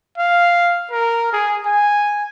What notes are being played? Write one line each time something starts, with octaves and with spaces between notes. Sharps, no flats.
F5
A#4
G#4
G#5